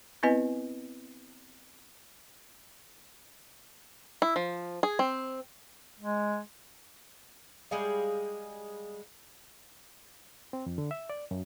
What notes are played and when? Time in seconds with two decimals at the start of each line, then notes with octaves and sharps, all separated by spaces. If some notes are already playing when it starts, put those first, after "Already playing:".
0.23 B3 C4 E4 B4 D#5 G#5
4.22 E4
4.36 F3
4.83 G#4
4.99 C4
6.00 G#3
7.71 G3 G#3 G#4 F5
10.53 C4
10.66 F2
10.78 D3
10.91 E5
11.10 D5
11.31 F#2